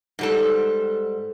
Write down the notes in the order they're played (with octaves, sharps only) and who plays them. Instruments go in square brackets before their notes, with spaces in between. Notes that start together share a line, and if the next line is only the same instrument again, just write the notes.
[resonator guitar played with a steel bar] G#2 G3 A4